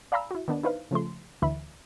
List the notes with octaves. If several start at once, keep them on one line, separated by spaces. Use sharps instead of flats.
D5 F5 G#5 A#5 B5 E6
E4 F#4
D#3 B3 D4
D#4 E4 B4 C5 F5
C#3 F3 A3 C6
D2 D3 E3 E5 B5